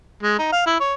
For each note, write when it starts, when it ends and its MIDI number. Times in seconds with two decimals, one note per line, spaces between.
0.23 0.34 56
0.38 0.50 63
0.52 0.63 77
0.66 0.77 64
0.80 0.94 73